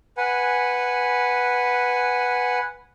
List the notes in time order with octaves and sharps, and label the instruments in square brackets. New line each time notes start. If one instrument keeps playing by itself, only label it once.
[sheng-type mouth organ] B4 F#5 G#5